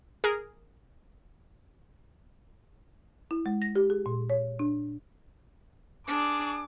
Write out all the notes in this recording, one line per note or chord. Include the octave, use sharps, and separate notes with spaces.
G#4 A#4
E4
G#3
A#6
G4
G#4
A#2
C#5
D4
D4 G#4 D6